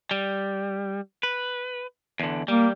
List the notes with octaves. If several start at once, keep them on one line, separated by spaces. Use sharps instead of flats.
G3
B4
E2 D3
G3 A#3